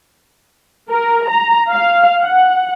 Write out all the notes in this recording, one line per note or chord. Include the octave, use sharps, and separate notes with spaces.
A#4
A#5
F5
F#5